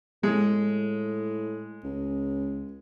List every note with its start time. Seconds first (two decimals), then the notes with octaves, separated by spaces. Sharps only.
0.23 A2 G#3
1.83 C#2